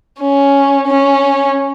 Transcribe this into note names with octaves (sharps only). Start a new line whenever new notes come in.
C#4
C#4